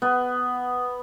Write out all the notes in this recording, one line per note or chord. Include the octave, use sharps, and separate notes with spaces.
B3